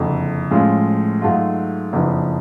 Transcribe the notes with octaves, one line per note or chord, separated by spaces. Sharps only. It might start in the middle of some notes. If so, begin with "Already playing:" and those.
Already playing: F#1 F2 D3
A2 F3 G#3 C#4 F4
G#2 F#3 A3 F4
F#1 F2 F3 B3 D4